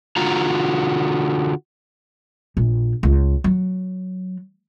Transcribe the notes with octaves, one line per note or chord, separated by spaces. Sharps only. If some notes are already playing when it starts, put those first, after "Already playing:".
D3 F4 F#4 A#5
A#1
C#2
F#3